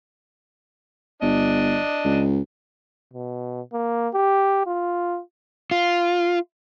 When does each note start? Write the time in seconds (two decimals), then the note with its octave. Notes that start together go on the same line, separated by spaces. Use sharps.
1.22 G1 D4 D#5
2.05 C#2
3.13 B2
3.73 A#3
4.14 G4
4.66 F4
5.71 F4